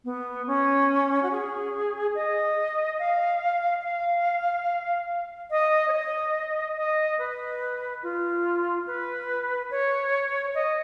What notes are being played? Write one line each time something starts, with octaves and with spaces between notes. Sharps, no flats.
B3
C#4
F#4
G#4
D#5
F5
F5
D#5
C#5
D#5
D#5
B4
F4
B4
C#5
D#5